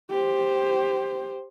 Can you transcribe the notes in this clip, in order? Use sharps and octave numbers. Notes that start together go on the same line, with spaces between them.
G4 C5